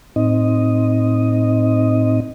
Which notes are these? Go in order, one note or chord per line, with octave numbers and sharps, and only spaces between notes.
A2 C4 D#4 D#5